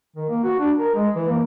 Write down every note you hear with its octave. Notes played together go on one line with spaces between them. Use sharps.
D#3
A#3
F#4
D4
A#4
G#3
E3
A#3